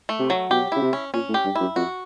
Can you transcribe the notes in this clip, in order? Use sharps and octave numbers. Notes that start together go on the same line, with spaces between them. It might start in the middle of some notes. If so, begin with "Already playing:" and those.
A3
C3
F#3
B2 G4
C#3 E4
C3
C#4
A#2 C#4
A2
G4
G2
F#2 E4
F2 F#4